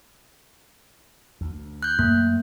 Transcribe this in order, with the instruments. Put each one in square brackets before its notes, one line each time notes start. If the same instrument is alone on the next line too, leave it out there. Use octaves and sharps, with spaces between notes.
[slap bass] D2
[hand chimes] F#6 G6
[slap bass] F#2 A3 [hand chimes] A#3